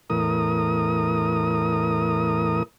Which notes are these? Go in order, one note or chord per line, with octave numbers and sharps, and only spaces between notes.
E2 A2 A#4 D#6